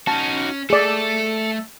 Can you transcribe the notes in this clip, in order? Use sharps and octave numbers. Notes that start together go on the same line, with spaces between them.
C#4 D#4 F#4 A5
A3 G#4 A4 D5